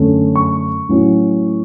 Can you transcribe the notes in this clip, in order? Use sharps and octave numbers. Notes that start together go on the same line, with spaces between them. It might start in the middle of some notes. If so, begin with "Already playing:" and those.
Already playing: F#2 D3 A3 C#4
C#6
A2 F#3 C#4